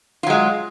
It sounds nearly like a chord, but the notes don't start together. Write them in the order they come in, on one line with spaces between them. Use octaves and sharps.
F4 F#3 G#3